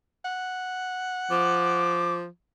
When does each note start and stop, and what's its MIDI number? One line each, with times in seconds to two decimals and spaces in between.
0.25 2.04 78
1.31 2.26 53
1.31 2.15 86